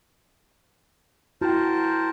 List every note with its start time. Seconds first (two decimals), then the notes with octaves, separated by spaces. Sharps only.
1.41 E4 F#4 A#4 C5 G5 A5